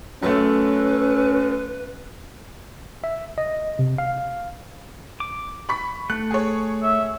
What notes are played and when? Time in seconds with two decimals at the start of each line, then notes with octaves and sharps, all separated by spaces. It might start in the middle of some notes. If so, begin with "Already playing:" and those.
0.23 F#2 A3 C#4 B4
3.04 E5
3.38 D#5
3.79 C3
3.98 F5
5.20 D6
5.69 B5 C#6 B6
6.10 A3 F#6
6.31 G#4 C#5
6.83 E5